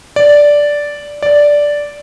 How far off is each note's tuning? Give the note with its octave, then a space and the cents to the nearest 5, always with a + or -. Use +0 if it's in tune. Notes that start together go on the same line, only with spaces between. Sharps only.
D5 -5
D5 -5